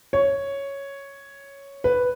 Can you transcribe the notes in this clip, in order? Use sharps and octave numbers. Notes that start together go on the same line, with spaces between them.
C#5
B4